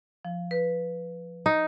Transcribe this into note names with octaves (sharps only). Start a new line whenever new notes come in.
F3
B4
D#4